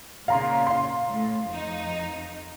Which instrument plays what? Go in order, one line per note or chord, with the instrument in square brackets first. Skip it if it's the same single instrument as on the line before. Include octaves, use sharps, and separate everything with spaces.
[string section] A#2 C#3 [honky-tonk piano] F5 A#5 C6
[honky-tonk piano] F5 C6
[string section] A2
F2 D#4